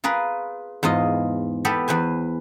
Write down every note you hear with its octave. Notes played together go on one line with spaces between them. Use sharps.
F4 G#4 A#4 B4
E2 G#2 F4 D#5
B3 G4 A4 B4
E2 B4 C5 G#5